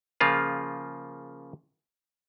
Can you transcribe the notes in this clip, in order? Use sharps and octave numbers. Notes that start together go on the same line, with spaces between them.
C#3 F3 A#3 F4 G#4